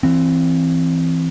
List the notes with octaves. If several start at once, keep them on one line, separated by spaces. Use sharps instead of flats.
E3 C4